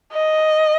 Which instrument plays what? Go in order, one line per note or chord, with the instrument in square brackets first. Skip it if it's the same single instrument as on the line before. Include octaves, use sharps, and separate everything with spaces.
[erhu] D#5